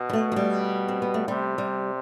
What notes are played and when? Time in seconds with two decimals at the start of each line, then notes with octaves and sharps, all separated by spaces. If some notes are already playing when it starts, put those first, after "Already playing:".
Already playing: B2
0.09 G3
0.13 A3
0.32 F#3
0.36 G3
0.88 C4
1.02 B3
1.14 A3
1.28 C3 G3
1.58 G3